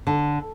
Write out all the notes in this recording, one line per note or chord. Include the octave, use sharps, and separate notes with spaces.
D3